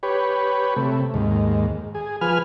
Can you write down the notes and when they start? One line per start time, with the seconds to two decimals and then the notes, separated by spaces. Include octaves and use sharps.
0.03 G4 B4 C#5
0.76 C3 A3
1.14 D#2 G#2
1.95 G#4
2.21 F3 B4 G#5 F6